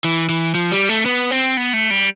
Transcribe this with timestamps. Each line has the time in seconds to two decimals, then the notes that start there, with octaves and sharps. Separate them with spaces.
0.04 E3
0.29 E3
0.55 F3
0.72 G3
0.89 A3
1.06 B3
1.31 C4
1.57 B3
1.73 A3
1.91 G3